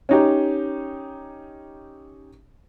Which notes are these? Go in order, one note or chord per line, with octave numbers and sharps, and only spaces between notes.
C#4 D#4 G4